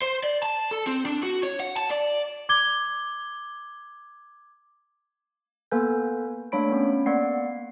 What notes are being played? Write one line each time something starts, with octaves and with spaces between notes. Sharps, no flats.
C5
D5
A5
A4
C4
D4
F#4
C#5
F#5
A5
D5
D6 G#6 G7
A#3 B3 A4 B4 G#5 G6
A3 A#3 D4 C#5 B5 D7
B3 C#4
A#3 B3 D5 F#5 C7